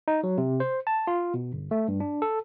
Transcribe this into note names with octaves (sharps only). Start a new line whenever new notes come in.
D#4
F#3
C3
C5
A5
F4
B2
G1
A3
G2
D4
A4